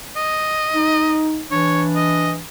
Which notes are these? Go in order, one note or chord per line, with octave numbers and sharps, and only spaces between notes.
D#5
D#4
E3 D4 C#5
D#5